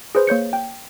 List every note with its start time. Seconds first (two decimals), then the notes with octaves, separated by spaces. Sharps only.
0.15 G#4 B4 C5
0.27 A#3 C#5 G6 C#7
0.53 G5